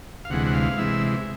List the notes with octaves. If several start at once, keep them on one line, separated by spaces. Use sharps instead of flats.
F5
D2 C3 E3 G#3 F#5
F#5
F5
C3 E3 G#3 E5